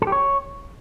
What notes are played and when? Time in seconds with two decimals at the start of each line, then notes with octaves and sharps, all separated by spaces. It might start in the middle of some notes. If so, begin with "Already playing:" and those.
0.02 A4
0.07 G4
0.12 C#5